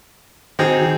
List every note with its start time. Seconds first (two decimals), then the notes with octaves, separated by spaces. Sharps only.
0.59 D#3 C4 D#4 F#4 G#4